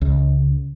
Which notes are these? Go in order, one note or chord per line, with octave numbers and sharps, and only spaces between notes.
C#2